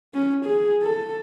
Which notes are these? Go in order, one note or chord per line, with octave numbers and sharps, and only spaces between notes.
C#4
G#4
A4